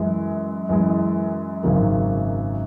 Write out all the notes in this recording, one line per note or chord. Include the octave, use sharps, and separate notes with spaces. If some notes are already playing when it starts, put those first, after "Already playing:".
Already playing: F#2 E3 G#3
F#2 E3 G#3
G#1 F#2 C#3 F#3 A#3